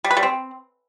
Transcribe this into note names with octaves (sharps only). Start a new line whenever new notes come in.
G3
B4
G3
C4